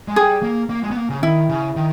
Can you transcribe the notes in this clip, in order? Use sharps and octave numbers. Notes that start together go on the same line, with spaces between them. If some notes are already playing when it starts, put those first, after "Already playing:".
G#3
G3 G#4
A#3
A#3
G#3
B3
A#3
C#3
D#3 E4
C#3
D#3